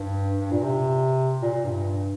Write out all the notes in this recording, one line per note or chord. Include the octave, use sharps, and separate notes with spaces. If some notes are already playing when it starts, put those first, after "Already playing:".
Already playing: G2
G2
A#2
C3
A#2
A#2
G2